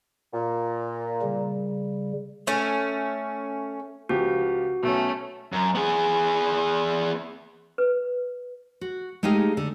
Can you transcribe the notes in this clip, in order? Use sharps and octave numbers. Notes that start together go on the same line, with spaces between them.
A#2
C#3 G3
A3 C#4
C#2 F3 F#4 G4
B1 A3 C#4 E6
F#2
B3 G#4
B4
F#4
G#3 A3 D#4 G4 G#4 F5
D3